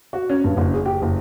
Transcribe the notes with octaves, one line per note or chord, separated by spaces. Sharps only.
F#4
C#4
G2
F#1
G#4
G4
F#1